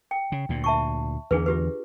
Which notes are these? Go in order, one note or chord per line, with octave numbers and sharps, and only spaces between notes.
G5
C#3
D2 A#2
E5 A5 C#6
E2 D3 D4 G#4 B4
F4 G4 B4